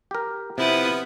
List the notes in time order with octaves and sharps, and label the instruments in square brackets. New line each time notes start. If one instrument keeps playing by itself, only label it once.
[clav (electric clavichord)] G4 A#4
[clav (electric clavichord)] C3 [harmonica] F3 B3 B4 [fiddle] E4 D#6